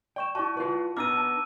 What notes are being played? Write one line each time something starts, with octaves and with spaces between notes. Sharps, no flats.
D5 G5 C#6 E7
E4 F#4 D5 A5 C#6
F4 F#4 B4
B3 D4 D#4 A#4 D6 E6 F6 D#7
A5